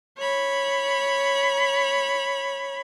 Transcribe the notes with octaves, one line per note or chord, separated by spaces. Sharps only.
C#5 B5